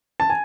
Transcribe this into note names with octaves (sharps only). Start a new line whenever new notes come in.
A5
G#5